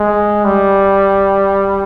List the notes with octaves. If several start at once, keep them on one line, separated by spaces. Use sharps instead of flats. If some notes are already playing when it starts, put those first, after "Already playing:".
Already playing: G#3
G3